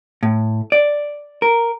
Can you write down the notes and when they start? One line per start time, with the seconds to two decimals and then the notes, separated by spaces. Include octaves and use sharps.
0.23 A2
0.72 D5
1.42 A#4